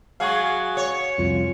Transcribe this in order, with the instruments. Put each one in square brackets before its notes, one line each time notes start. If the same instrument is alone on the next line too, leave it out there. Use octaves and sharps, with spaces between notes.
[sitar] F#3 G#3 G#4 [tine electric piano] F5 F#5 C#6
[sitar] C#5
[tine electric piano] C2 F2 F4